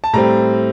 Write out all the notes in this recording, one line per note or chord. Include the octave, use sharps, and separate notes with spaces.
A5
A2 G3 C4 A#5